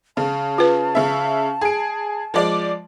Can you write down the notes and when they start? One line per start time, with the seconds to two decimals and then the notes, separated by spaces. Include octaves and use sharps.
0.17 C#3 A5
0.58 F4 B4
0.95 C#3 E5
1.61 G#4 D7
2.34 F3 G#3 D5